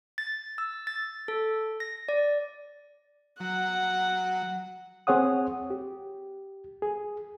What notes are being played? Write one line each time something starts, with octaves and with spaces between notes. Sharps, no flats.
A6
E6
A6
A4
A#6
D5
F#3 F#5
C4 G#4 C#5 F#5 D#6
G4
G#4